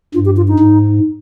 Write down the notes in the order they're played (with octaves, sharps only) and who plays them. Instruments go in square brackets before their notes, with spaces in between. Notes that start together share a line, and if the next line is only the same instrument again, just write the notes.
[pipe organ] G2 [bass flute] F4
[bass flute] G4
F4
D#4
[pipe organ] G#2